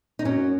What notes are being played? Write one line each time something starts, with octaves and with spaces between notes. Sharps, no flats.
D#4
F#2 F#3 C#4